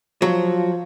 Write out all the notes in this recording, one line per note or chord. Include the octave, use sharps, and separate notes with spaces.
F3 F#3